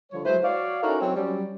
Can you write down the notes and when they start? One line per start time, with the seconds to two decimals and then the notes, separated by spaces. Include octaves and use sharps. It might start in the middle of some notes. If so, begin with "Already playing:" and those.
0.12 D3 F3 G3 C#5
0.25 F#3 G#3 E4 B4 C5
0.44 F#4 C#5 D5 F5
0.83 C#4 D#4 E4 F#4 A4 A#4
1.00 F#3 C4 C#5
1.16 F#3 G3 C#4